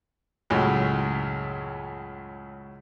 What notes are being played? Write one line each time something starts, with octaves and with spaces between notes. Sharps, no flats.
C#2 F#2 A2